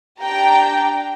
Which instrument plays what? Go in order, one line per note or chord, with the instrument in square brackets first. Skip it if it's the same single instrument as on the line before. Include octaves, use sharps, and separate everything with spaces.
[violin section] D4 G4 G5 A#5